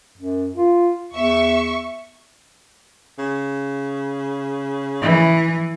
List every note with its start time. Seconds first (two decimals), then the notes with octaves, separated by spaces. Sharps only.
0.18 F#2
0.55 F4
1.14 E2 E5 C#6
3.19 C#3
5.03 E3